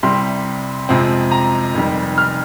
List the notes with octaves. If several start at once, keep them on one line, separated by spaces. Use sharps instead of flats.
C2 C3 G3 C6
F2 C3 F3 G#3 C4
A#5
F1 F2 D#3 G3
F6